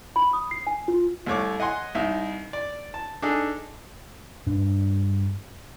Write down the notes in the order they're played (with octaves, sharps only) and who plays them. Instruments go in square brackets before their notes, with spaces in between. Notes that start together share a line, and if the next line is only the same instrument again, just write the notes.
[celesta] B5
D#6
C7
G#5
F4
[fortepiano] C2 A3 C#5 D6
D#5 F#5 G#5 C6
C2 D#4 E5
D5
A5
D4 D#4 G#4 A4
[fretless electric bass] G2 D4